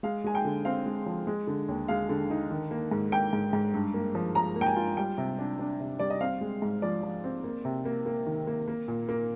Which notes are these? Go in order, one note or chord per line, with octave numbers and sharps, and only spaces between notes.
G#3 F5
G#3 G#5
G5
D3
C4 F5
G#3
F3
G#3
D3
D#2
G#3 F5
D3
D#4
D#3
A#3
G#2
A#3 G5
G#2
G#2
G2
A#3
F3
F3 A#5
A#3
G5
G#5
F4
G3 G5
C3
D4
D4
C3
G3 D5
D#5
C4 F5
G#3
G#2
F3 D5
F3
C4
A#3
C3
A#3
A#3
D#3
A#3
A#3
A#2
A#3